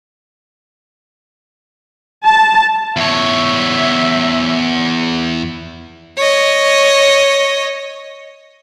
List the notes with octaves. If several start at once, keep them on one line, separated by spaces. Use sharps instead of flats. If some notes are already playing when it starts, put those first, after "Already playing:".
A5
E2 C#5 E5
C#5 D#5